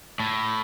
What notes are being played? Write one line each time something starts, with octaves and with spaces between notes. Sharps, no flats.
A2